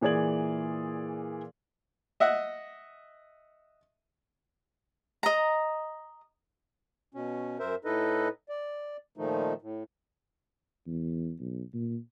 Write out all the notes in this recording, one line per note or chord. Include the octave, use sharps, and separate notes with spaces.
A#2 E3 G#4 D5 G#6 F#7
D#5 E5 F#5
D#5 A#5
B2 C#4
F#2 A#4 C5 E5
A2 D#4 E4 A4 B4 D#5
D5
A#2 D#3 F3 A3 D#4
A2
E2
B1
A#2